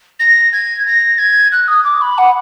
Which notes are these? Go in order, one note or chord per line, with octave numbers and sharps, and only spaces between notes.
A#6
G#6
A#6
G#6
F#6
D#6
D6
B5
F#5